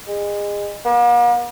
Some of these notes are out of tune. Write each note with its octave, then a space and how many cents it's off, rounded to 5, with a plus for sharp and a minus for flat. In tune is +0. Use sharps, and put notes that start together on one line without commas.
G#3 -25
A#3 +45